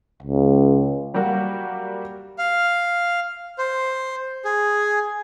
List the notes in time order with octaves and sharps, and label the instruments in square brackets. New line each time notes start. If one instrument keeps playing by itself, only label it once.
[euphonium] C#2
[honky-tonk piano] F#3 G3 A#3 F#4
[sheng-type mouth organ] F5
C5
G#4